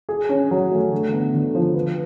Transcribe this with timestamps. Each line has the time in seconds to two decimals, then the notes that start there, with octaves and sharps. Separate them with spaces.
0.09 G#4
0.29 C#4
0.51 F#3
0.72 A3
0.92 D3
1.12 B3
1.34 D3
1.55 F3
1.74 B4